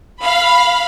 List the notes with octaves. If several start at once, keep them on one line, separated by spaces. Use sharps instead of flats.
F5 B5